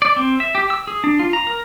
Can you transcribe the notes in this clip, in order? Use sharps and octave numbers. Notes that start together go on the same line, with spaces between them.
D5
C4
E5
G4
E6
G#4
D4
F4
A#5
A#4